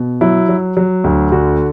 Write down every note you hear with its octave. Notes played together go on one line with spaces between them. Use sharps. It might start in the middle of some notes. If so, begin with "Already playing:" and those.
Already playing: B2
F#3 E4
F#3
F#3
D2
D3 F#4